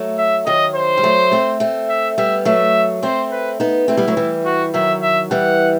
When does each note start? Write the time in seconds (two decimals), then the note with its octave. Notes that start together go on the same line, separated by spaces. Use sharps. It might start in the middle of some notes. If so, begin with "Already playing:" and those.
Already playing: F#3 A3
0.18 E5
0.46 D#3 F#3 D#5
0.75 C5
0.97 G3
1.03 F#3 A3
1.32 A3 C4
1.60 A3 C4
1.89 E5
2.18 G3 B3 E5
2.45 F#3 A3 E5
3.03 A3 C4 C5
3.31 B4
3.60 B3 D#4
3.88 A3 C4 E4
3.97 G3 B3
4.07 F#3 A3
4.17 E3 G3
4.45 F#4
4.74 D#3 F#3 E5
5.02 E5
5.31 E3 G3 F#5